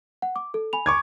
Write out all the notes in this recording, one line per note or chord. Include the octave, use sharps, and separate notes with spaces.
F#5
D6
A4
G#5 B5 F7
C#6 D6 G#6